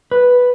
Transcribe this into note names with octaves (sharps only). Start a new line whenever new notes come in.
B4